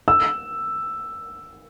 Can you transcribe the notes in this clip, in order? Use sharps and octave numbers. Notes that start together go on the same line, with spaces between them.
E6